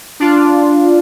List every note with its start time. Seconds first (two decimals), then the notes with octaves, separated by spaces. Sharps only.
0.20 D4 F4